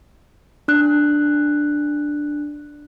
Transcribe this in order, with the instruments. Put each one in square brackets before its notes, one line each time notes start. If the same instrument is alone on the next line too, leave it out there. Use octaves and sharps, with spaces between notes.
[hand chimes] D4 F#6